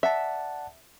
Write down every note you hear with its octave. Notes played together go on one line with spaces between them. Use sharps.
D5 E5 F#5 A5